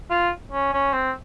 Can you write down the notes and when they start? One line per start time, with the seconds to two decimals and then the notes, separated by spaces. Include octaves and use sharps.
0.11 F4
0.52 C#4
0.73 C#4
0.93 C4